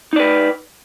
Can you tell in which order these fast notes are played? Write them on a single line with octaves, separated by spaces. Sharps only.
D#4 D5 B4